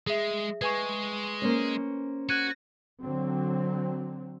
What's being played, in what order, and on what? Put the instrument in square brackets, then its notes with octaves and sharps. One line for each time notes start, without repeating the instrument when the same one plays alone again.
[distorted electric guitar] G#3 [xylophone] G#4 E5
[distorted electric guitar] G#3 [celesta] B4 G#5 C#6 [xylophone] G#6
[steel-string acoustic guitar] A#3 C#4 C5
[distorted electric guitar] F#4 [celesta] F#6 G#6 D#7
[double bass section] D3 F#3 C4